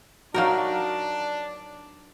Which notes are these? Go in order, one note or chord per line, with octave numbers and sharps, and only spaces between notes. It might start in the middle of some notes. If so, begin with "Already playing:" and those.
F#3 D4 D#4 F#4 A#4 F5